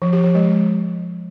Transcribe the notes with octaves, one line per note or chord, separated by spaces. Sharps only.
F3
G4
F3
G#3